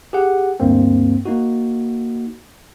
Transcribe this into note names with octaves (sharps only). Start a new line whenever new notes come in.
G4 G#4 F#5
D2 G2 A#3 C4
A#3 D#4 F#4